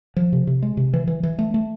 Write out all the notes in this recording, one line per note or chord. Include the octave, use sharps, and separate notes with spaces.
F3
C3
C3
G#3
C3
E3
E3
E3
A3
A3